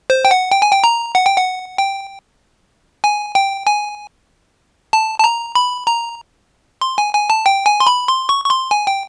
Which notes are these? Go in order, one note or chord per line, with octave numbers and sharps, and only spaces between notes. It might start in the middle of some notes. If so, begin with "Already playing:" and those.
C5
G5
F#5
G5
G#5
G5
A#5
F#5
G5
F#5
G5
G#5
G5
G#5
A5
A5
A#5
B5
A#5
C6
G#5
G#5
A5
G5
G#5
C6
B5
C6
C#6
C#6
C6
G#5
G5